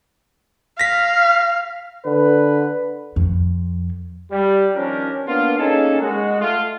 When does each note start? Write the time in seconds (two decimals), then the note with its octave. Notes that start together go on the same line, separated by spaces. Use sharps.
0.79 F5 A#6 B6
2.06 D3 B4
3.16 F2
4.31 G3
4.75 D#3 F3 C#4 D4 G4 A#4
5.27 A#3 B3 D4 F4
5.59 A#3 C#4 D#4 G#4 A4
6.00 G#3 F#4
6.41 A3 F4